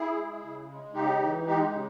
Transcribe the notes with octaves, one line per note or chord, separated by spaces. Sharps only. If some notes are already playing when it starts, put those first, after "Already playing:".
Already playing: E4 G#4
G#3
C#3
G#3
C#3 D#4 G4
E3
G#3 D#4 G4
C#3